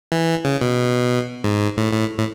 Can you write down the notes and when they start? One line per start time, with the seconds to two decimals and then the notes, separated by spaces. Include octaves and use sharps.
0.12 E3
0.45 C#3
0.61 B2
1.44 G#2
1.77 A2
1.93 A2
2.18 A2